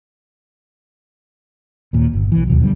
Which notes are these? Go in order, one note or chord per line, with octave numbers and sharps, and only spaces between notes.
D#2 A#2
G1
B1 E3
D#2 C3 F#3
B2 D3 F3 G3